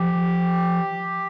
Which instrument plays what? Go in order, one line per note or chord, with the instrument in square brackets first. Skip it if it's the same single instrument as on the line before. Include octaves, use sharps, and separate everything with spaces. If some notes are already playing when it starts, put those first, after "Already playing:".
Already playing: [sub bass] F3 [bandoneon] G4